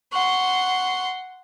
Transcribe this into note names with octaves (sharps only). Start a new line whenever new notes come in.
F#5 C6 C#6